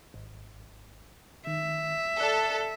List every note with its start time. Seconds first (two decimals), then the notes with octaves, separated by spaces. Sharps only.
0.14 G#1
1.47 D#3 E5
2.20 A4 D5 F#6